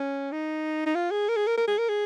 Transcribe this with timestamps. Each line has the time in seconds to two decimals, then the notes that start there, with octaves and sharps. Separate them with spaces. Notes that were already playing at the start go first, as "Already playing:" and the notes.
Already playing: C#4
0.32 D#4
0.86 D#4
0.95 F4
1.11 G#4
1.29 A#4
1.37 G#4
1.47 A#4
1.58 A#4
1.67 G#4
1.78 A#4
1.89 G#4